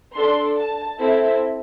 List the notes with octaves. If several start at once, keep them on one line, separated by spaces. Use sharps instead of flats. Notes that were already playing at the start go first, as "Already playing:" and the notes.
D4 A4 C6
A5
C4 E4 A4 E5